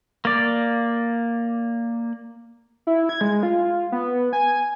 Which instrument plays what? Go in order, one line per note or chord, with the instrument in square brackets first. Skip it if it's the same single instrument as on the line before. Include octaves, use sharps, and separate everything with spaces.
[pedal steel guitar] A#3 D5
[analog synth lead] E4
G#6
G#3
F4
B3
G#5